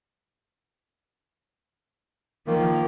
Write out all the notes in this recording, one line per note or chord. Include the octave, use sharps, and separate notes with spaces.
D#3 F3 A#3